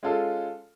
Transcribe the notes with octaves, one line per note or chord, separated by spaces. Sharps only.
G#3 C#4 F4 A4